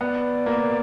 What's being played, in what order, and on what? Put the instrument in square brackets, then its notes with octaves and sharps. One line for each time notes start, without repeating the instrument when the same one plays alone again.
[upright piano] B3 [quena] D5
[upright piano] A#3